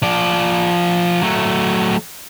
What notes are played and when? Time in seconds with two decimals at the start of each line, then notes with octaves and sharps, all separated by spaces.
0.03 F3 D5
1.23 F#3 A3